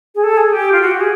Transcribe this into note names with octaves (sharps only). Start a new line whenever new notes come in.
G#4
A4
G#4
G4
F4
F#4
G4
G#4